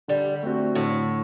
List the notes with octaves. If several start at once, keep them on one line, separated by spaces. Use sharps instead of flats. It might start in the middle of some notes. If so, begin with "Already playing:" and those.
D3 G3
A3 C4 F#4
A2 D3